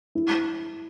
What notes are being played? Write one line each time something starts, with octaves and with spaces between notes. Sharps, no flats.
E4